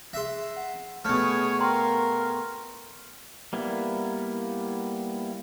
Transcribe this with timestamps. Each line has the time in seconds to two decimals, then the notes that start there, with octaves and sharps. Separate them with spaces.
0.13 G#4 E5 C6 F#6 A#6
0.56 F#5
1.05 B2 A3 G#4 C#5 F6
1.60 A#4 F5 G5 A#5 C6
3.53 G3 A#3 B3 E4